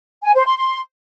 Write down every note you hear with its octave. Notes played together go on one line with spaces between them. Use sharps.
G#5
C5
C6
C6